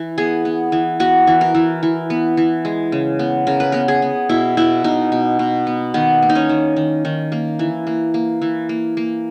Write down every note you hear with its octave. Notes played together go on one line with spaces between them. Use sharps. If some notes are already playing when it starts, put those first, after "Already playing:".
Already playing: E3
B3 G#4
B3
E3
B3 F#4
E3
A#4
E3
E3
B3
E3
G#3
C#3
B3
C#3 A#4
B4
B3 A#4
G#4
B3
B2 E4
B2 E4
B2 D#4
B2
B2
B3
D#3 B3
A#3
D#4
C#4
D#3
D#3
D#3
A#3
E3
A#3
A#3
E3
A#3
A#3